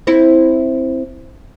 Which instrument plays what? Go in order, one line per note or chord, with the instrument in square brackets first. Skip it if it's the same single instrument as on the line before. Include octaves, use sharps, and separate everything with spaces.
[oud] C4 E4